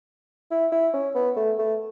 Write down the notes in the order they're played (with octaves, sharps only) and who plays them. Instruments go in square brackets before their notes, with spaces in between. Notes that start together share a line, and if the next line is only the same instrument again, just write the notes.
[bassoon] E4
E4
C#4
B3
A3
A3